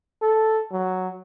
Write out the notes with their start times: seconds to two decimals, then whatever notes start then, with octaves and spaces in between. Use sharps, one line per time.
0.22 A4
0.72 F#3